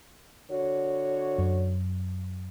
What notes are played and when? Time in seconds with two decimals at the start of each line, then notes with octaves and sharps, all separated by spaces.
0.51 D3 F#4 C#5
1.38 F#2